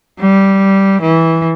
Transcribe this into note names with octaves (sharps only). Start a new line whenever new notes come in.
G3
E3